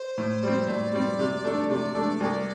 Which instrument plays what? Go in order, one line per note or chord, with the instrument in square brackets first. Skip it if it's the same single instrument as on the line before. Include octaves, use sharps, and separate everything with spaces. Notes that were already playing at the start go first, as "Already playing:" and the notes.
Already playing: [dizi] C5
[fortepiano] A2
G3 C4
[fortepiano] A2 [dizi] D5
[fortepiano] G3 C4
C3
A3 D4 A4
[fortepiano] C3 [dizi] D5
[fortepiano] A3 D4 A4
C2